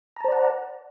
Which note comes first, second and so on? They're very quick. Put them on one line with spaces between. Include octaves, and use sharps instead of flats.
A#5 A5 C5 D5 F#5